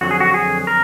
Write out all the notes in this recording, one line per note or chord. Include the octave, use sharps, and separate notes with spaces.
F2 D3 F#3 F#4
G#4
F#4
G#4
A#4